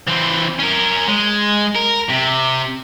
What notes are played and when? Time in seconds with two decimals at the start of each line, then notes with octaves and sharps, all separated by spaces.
0.07 E3 C4
0.59 C#4 A#4
1.08 G#3
1.76 A#4
2.10 C3